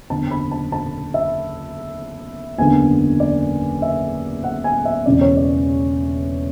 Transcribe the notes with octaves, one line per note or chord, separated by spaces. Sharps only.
F#1 E2 D3 A5
B5
A5
A5
E5
F#1 E2 D3 G#5
D5
E5
F#5
G#5
E5
E1 E2 C#3 E3 D5
C#5
D5